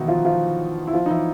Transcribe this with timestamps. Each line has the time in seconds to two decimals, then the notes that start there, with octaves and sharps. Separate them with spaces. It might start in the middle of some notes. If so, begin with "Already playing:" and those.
Already playing: B2 D#3 E3 B3 D#4 E4
0.08 F3 F4
0.25 F3 F4
0.87 E4
0.93 F3 F4
1.06 D#4
1.10 E3 E4